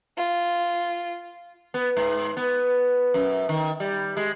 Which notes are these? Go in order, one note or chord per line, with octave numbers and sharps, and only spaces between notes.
F4
B3
G#2
B3
F#2
D#3
G3
G#3